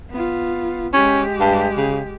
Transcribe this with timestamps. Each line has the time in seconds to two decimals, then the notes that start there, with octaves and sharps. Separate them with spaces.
0.11 B3 F4
0.93 G#3 C#4 G4
1.40 G2
1.77 C#3